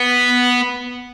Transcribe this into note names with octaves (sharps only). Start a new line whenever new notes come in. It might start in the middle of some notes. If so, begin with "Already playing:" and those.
Already playing: B3